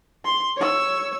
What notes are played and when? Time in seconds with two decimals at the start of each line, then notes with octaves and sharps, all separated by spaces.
0.25 C6
0.56 C#5 E6